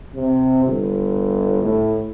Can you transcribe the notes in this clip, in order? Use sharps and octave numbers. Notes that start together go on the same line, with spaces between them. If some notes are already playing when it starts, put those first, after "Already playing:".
C3
G1
A2